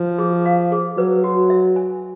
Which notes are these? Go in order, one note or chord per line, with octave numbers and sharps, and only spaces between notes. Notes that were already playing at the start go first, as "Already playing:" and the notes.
Already playing: F3
G#4
F5
G#4
F#3 B4
F#4
E5
G#5